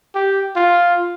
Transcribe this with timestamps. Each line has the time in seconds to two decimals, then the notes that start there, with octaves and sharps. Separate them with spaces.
0.15 G4
0.56 F4